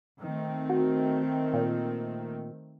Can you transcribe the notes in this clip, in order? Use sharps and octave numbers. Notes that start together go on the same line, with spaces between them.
D#3 A3 C4
F#4
A#2